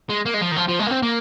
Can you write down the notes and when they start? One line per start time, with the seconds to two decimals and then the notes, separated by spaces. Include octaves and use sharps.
0.10 G#3
0.26 A#3
0.34 G#3
0.41 F3
0.52 D#3
0.56 F3
0.68 F3
0.79 G#3
0.86 A#3
0.91 C4
1.02 A#3